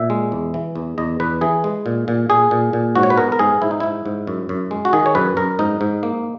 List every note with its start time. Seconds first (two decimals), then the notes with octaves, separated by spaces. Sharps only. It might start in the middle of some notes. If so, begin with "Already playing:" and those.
Already playing: A#2 E5
0.10 G#3
0.32 E2
0.54 E3
0.75 E2
0.98 E2 D#5
1.20 E2 B4
1.41 E3 G#4
1.64 G#3
1.86 A#2
2.08 A#2
2.30 A#2 G#4
2.51 A#2
2.73 A#2
2.95 G#2 F#4
3.03 C#5
3.10 B4
3.17 B3 A#4
3.32 A#4
3.39 G#2 G#4
3.62 G#2 E4
3.71 D#4
3.80 G#2 E4
4.06 G#2
4.27 F#2
4.49 F#2
4.71 G#3
4.85 F#4
4.93 D#3 G#4
5.06 C#5
5.15 F#2 B4
5.37 F#2 A#4
5.59 G#2 D#4
5.81 G#2
6.03 A#3